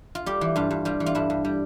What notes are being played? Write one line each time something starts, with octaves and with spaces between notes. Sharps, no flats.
F4
G3 G4
E3
G2 F4
G2
G3 F4
E3
F4
G2 E4
G2
G3